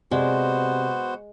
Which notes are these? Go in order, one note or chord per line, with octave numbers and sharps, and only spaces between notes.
C3 G#3 B3 F#4 C5 D5